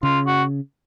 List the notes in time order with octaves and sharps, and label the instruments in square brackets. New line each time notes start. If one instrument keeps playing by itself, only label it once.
[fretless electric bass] C#3 [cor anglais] F4
[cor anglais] F#4